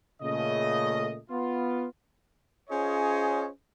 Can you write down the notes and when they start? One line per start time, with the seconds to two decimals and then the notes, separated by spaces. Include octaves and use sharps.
0.22 A#2 C#3 A3 D#5
1.30 B3 F4
2.70 C#4 F4 G#4 C5 C#5 D#5